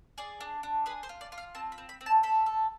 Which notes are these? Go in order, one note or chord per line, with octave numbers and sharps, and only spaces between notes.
G#4 D5
D4
D4
G#4 B4
C5
F4
D5
F4
F5
C4 A5
B5
C4
B5
C4
A5
A4 B5
A4